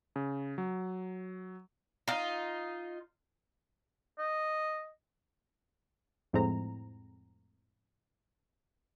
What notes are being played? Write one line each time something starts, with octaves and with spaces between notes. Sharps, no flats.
C#3
F#3
D#4 F4
D#5
F2 A2 G#3 C4 A#5